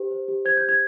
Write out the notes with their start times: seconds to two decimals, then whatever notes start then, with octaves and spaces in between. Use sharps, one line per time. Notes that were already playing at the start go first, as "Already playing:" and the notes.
Already playing: G4 B4 C5
0.11 C5
0.28 G4
0.45 C5 G#6
0.57 G6
0.63 G4
0.69 G#6